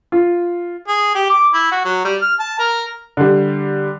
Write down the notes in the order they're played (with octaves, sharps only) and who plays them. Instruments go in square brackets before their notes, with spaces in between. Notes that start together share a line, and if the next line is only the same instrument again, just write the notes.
[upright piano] F4
[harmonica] G#4
G4
D6
E4
F#4
F#3
G3
F6
A5
A#4
[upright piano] D3 G3